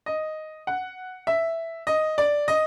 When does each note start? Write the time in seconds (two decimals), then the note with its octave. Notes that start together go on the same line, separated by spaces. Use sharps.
0.06 D#5
0.67 F#5
1.27 E5
1.87 D#5
2.18 D5
2.48 D#5